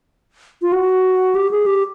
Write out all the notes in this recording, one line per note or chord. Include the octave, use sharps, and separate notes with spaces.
F4
F#4
G4
G#4
G4